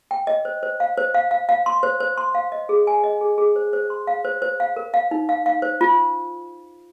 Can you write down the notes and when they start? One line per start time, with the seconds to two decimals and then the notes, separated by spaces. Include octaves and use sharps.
0.11 G5
0.27 D#5
0.45 C5
0.63 C5
0.80 F5
0.97 C5
1.14 F5
1.31 F5
1.49 F5
1.66 C6
1.83 C5
2.00 C5
2.17 C6
2.35 F5
2.52 D#5
2.69 G#4
2.87 G#5
3.04 D#5
3.21 G#4
3.38 G#4
3.56 C5
3.73 C5
3.90 C6
4.07 F5
4.25 C5
4.42 C5
4.60 F5
4.76 A#4
4.94 F5
5.11 D#4
5.29 F5
5.46 F5
5.62 C5
5.81 F4